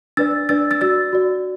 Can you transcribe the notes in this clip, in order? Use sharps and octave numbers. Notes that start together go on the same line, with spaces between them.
D4 B4 D5 E6 A6
D4 B4 D5 E6 A6
E6 A6
F#4 D5 E6 A6
F#4 D5